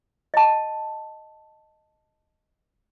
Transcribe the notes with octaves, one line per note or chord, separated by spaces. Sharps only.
D#5 A5